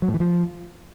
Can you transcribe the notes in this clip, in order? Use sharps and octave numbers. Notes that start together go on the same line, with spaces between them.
F#3
A2
E3
F3